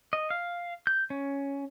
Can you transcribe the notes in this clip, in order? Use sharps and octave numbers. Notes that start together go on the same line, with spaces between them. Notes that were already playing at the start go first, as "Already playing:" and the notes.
D#5
F5
G6
C#4